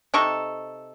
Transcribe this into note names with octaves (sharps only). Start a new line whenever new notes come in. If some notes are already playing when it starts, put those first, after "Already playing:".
C3 D#4 A4 C#6